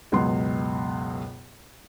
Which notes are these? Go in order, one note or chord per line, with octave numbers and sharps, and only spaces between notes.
C#2 F#2 B2 B3 C6